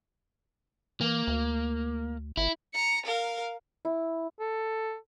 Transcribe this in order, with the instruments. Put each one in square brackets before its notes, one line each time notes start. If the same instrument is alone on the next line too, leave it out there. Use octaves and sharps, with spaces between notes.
[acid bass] E3 [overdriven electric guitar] A#3
[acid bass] D2
[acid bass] G1 [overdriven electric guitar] E4
[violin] A#5 C#7
A#4 F5
[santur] E4
[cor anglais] A4